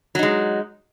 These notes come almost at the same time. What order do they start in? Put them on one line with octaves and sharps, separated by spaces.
F#3 D#4 G#3